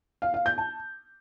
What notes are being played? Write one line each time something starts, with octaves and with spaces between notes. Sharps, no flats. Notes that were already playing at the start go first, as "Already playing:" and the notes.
F5
F5
G6
A5